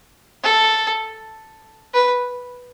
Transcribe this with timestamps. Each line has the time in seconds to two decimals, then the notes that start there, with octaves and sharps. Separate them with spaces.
0.43 A4
1.94 B4